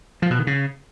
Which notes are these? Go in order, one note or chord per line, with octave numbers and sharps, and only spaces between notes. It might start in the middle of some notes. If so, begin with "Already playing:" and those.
F3
B2
D#3
C#3